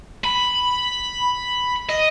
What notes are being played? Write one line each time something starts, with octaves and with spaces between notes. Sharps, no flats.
B5
D#5